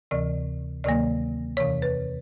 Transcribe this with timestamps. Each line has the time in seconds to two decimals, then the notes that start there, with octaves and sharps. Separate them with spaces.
0.11 D2 C3 E3 D5
0.84 D2 C3 D#3 F#3 A#3 D5
1.57 E2 C3 E3 C#5
1.82 B4